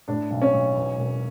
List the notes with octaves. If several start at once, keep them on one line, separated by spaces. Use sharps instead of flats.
A2 D4
B1
C#4
B1
E2
E1